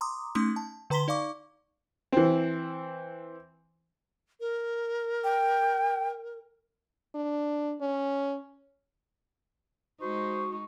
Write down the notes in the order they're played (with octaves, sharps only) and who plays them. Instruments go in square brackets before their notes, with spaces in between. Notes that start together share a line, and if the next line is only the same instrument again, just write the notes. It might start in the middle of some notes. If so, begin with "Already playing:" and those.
[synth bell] A#5 C6 D6 D#6
A3 C#4 D#4 C6 D#6
A5
D3 B4 A#5 C6 B6 G7
D#4 D5 F5 C#6 D6
[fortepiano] E3 C4
[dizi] A#4
[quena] G5
[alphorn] D4
C#4
[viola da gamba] G#3 D#4 [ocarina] F#4 [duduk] C5 [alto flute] C#6